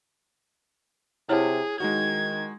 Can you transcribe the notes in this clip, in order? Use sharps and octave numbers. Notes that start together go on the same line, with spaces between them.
C3 E4 G#4 C#5 F#5 A5 F6
D#3 G#3 D#4 F#4 G#6